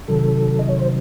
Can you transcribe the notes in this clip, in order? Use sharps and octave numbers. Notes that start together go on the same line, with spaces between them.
C3 D#3 F#3 A4
D#5
C#5
C5